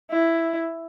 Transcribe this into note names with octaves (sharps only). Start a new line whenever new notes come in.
E4